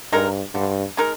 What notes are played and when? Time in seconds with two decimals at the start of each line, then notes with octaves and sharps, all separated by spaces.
0.12 G2 G#3 D#4 A#4
0.55 G2 D3
0.97 G#3 D#4 A#4